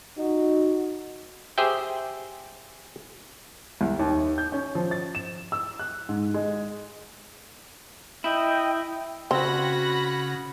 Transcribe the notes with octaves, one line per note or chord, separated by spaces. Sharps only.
D#4 F#4
G4 G#4 C5 E5 G5
C2
D#2
G6
C#4
F3
A6
E7
E6
F#6
G#2
G#3
E4 D#5 G5
C#3 C4 F#4 B5 F#6 A#6